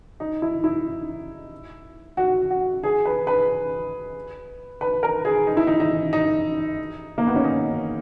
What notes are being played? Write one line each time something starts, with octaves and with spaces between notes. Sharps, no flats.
D#4
E4
E4
F#4
F#4
G#4
B4
B4
B4
A#4
G#4
D#4
E4
D#4
D#4
D#4
A#3
B3
C#4
D#4